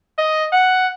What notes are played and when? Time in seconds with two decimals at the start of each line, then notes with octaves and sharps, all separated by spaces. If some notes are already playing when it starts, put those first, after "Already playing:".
0.18 D#5
0.53 F#5